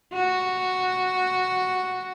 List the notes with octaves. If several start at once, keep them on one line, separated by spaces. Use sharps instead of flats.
F#4